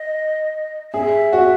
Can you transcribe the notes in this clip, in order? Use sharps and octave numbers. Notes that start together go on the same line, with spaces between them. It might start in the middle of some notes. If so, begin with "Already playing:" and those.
Already playing: D#5
G#4 E5
F#4